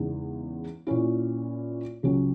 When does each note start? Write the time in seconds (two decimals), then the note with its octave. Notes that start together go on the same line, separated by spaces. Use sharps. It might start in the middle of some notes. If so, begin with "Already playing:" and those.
Already playing: E2 C#3 E3 G#3 D#4
0.87 A#2 A#3 C#4 E4
2.03 C#2 C#3 F#3 C#4